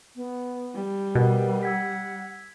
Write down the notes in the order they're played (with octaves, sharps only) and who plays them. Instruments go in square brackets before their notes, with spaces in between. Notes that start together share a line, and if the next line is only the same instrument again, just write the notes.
[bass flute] B3
[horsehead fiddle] G3
[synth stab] B2 [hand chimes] A#4 D#5 F#5 [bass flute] B4
[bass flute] F#5 [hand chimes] E6 G#6 B6